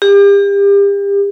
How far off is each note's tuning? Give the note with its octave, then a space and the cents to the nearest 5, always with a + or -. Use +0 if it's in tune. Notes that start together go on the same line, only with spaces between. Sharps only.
G4 +35